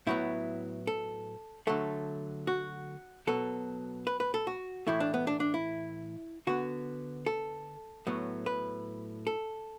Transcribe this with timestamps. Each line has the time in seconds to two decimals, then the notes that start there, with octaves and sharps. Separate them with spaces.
0.07 A2 F#3 B3 E4
0.87 A4
1.67 D3 F#3 A3 A4
2.47 F#4
3.27 B2 F#3 B3 A4
4.07 B4
4.20 B4
4.34 A4
4.47 F#4
4.87 A2 E3 A3 E4
5.00 D4
5.14 B3
5.27 D4
5.40 D4
5.54 E4
6.47 D3 B3 F#4
7.26 A4
8.07 A2 F#3 B3
8.46 B4
9.27 A4